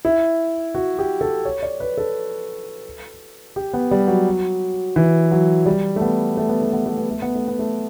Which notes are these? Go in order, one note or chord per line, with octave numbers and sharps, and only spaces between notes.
E4
F#4
G4
A4
C#5
D5
B4
A4
G4
B3
G3
F#3
E3
F#3
G3
A3
B3
A3
B3
A3
B3
A3
B3
A3
B3
A3
B3
A3